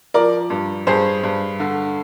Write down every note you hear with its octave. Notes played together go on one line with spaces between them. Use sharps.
F3 A#4 D5
G2
G2 G#4 C5
G2
D3